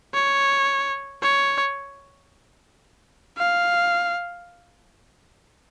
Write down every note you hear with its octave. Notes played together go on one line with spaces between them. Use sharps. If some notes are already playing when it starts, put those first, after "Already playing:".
C#5
C#5
F5